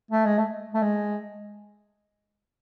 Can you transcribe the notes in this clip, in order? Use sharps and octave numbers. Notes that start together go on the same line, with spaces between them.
A3
G#3
A3
A3
G#3